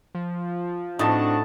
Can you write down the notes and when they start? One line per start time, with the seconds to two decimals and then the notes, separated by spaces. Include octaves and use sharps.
0.15 F3
0.99 A2 C4 D4 D#4 F#4 A5